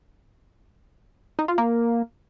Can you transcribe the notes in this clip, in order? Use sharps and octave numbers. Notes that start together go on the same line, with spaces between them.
D#4
F4
A#3